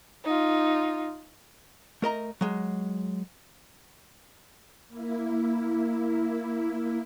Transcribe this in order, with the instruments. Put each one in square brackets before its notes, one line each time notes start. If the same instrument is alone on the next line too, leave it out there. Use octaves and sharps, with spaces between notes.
[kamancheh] D#4 F4
[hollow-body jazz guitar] A3 A#4 D#5 A#5
F#3 G#3
[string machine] A#3 E4